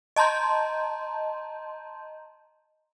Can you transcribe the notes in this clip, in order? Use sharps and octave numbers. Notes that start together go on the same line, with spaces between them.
D#5 A5 A#5 C6 G6